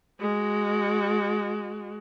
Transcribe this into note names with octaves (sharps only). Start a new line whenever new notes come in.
G#3 F#4